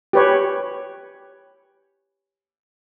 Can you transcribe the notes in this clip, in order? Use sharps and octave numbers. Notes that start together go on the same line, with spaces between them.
G4 B4 C#5